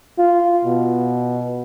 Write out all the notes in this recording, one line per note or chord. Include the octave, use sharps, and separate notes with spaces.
F4
B2